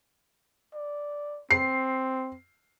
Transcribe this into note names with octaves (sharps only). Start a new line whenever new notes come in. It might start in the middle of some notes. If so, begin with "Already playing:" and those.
D5
C4 C7